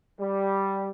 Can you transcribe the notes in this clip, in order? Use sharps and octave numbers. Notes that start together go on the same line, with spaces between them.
G3